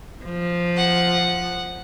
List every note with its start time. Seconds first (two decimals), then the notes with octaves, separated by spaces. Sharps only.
0.25 F3
0.76 F#5